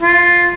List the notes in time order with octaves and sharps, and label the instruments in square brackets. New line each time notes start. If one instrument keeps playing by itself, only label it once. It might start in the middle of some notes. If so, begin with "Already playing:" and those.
[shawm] F4